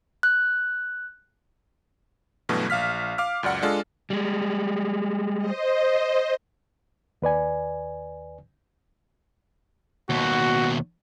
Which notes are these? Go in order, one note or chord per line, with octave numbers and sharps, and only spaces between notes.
F#6
G2 B2 E3 F#3 A3
A#1 F5 F6 B6
F5 D6 F6
C#2 F#2 D5 F#5 C#7
G#3 D4 F4 A4
G3 G#3
C5 D#5
D#2 B4 D5 G#5
D#2 B2 F#4